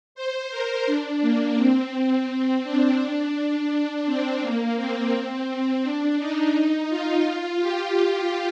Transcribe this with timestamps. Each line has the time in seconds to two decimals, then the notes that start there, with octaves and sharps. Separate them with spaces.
0.15 C5
0.51 A#4
0.87 D4
1.22 A#3
1.57 C4
2.28 C4
2.64 D4
4.06 C4
4.41 A#3
4.76 C4
5.12 C4
5.83 D4
6.19 D#4
6.90 F4
7.25 F4
7.60 G4